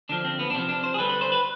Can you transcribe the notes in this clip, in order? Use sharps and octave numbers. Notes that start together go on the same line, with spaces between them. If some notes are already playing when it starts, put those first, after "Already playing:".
D3 F3 D4
C4
B3
D4
C3 F3 C4
D4
C5
G#4
D3 G3 B4
B4
C5
B4